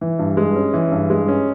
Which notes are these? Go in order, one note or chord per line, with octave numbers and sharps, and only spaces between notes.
E3
G2
G#3
C#4
E3
G2
G#3
C#4